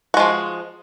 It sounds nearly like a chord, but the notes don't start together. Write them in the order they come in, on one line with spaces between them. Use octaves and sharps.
F#4 G#3 F3